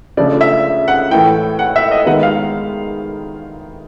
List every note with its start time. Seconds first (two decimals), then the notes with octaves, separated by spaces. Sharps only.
0.17 C#3 F3 A3 D4 D5
0.41 E5
0.88 F#5
1.11 A2 E3 A3 G5
1.59 F#5
1.76 E5
1.91 D#5
2.06 D#3 G#3 B3 F#5
2.23 F5